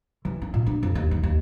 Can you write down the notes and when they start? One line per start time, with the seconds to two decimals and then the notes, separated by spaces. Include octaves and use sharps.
0.25 E3
0.42 C#4
0.54 A#2
0.66 D4
0.83 F2
0.95 D#2
1.11 D#3
1.23 D#2